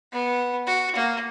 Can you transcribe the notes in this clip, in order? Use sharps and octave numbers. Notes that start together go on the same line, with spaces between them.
B3
F#4
A#3